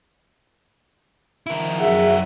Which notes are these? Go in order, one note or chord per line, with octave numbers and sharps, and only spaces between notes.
D#3 F3 E4 A#4
F#2 F#3 G#4 E5 F#5